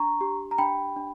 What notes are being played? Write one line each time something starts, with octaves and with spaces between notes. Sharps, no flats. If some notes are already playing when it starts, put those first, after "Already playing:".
Already playing: D4 A#5 C#6
G4
A#5
D4 G5 B5
D4